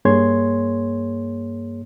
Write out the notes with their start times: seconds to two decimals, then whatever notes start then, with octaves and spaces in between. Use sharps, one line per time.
0.05 G2 A#3 G#4 C#5 C6 G#6